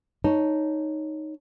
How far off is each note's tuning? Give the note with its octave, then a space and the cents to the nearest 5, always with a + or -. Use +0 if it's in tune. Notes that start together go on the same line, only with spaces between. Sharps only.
D#4 +0 C#5 +0 A5 +0